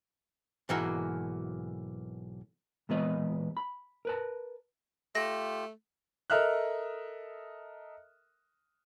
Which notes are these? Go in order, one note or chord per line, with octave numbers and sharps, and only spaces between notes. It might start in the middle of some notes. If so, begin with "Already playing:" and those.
B1 G#2 E3 A#3 F#4 A#4
A#2 E3 G#3 B3 B4 D#5
B5
A#4 B4 A5
A3 F4 G4 A#6
A4 A#4 D#5 E5 F6 F#6